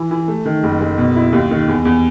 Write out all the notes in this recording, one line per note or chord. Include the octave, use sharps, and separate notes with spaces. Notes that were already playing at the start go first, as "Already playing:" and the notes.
Already playing: E3
E3
A3
D#3
F#1
F#1
B2
E4
D#2
D#3
E2
E2